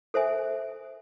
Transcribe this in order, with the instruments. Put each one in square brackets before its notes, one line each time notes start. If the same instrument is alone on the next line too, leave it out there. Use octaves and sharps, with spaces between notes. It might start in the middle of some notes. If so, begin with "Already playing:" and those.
[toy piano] A4 C5 E5 G#5